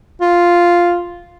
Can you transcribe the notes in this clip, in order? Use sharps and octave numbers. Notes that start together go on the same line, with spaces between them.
F4